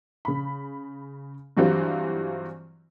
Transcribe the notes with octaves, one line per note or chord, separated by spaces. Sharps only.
C#3 B5
G2 E3 F#3 G3 C4 F4